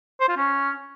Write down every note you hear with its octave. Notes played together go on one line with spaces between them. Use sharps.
C5
F4
C#4